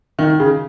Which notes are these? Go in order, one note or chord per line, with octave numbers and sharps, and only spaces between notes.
D#3
C#3